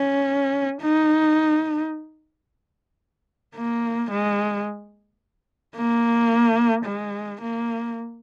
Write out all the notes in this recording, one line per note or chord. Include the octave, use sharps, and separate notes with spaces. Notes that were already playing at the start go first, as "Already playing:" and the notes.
Already playing: C#4
D#4
A#3
G#3
A#3
G#3
A#3